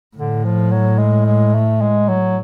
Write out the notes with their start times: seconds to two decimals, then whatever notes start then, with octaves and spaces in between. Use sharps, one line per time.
0.16 A2 D3
0.44 F3
0.71 F#3
0.99 G#3
1.26 G#3
1.55 A3
1.81 G#3
2.09 F#3